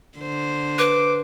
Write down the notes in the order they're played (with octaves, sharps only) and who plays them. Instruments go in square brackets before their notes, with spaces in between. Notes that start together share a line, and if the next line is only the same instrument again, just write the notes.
[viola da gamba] D3 C5
[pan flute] B4 [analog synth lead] D6